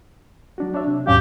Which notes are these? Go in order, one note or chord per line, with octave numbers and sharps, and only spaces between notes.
F#3 D4 F#4
D4 C#5 E5
C3
D#2 G#2 F#3 C#4 G4 F5